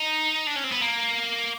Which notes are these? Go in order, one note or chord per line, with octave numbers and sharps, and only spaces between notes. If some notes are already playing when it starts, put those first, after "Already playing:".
Already playing: D#4
D4
C#4
C4
B3
A#3